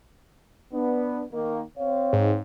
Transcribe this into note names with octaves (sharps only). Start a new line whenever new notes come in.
B3 D4
D#3 A#3
C4 C#5 F5
G#2